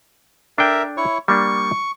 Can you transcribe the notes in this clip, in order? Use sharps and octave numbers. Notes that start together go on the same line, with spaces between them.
D4 A4 A#4 E5 G5
E4 C#5 C#6
G3 A#3 D4 C#6